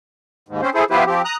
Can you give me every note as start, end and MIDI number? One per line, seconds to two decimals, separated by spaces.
0.49 0.61 39
0.49 0.61 44
0.62 0.70 60
0.62 0.70 61
0.62 0.70 72
0.75 0.84 64
0.75 0.84 68
0.75 0.84 69
0.75 0.84 72
0.90 1.04 53
0.90 1.04 59
0.90 1.04 64
0.90 1.04 67
0.90 1.04 71
0.90 1.04 72
1.07 1.22 53
1.07 1.22 60
1.07 1.22 67
1.25 1.37 82
1.25 1.37 87
1.25 1.37 90